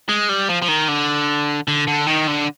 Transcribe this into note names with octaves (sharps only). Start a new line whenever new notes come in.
G#3
G3
F3
F3
D#3
D3
D3
D3
D#3
D3